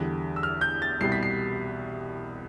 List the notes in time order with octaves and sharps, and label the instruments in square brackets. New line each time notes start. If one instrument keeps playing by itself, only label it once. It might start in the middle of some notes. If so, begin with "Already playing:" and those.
Already playing: [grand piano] E2 D3 G3
E6
F6
G6
A6
C2 B2 G3 C7
B6
C7